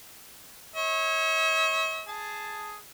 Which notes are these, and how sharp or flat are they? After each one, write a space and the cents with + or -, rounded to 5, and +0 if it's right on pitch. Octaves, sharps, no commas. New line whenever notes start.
C#5 -20 E5 -45
G#4 +0 A5 -5